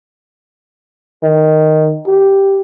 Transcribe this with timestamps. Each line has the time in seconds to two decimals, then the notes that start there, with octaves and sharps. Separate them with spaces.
1.23 D#3
2.07 G4